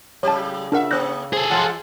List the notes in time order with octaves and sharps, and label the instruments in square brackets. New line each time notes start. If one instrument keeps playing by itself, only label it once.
[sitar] A2 F#3 [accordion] C#3 [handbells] C#5 A5
[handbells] D4 A#4 F#5 [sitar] F4 E5
[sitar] A2 A#3 C#4 [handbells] F#6 G6 A#6
[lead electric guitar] G#4 A4 [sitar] C5
[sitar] E3 G#3 [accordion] F4 F#5 A5